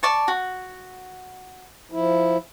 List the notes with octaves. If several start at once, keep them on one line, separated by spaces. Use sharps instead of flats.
D5 A5 C#6
F#4
F3 E4